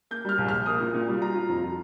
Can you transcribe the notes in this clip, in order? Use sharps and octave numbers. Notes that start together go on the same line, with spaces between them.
A#3 G6
G3 F6
A#1
F6
A#1
A#3 D#6
A#2
A#2
G3
F4 A#5
F4
F2
F4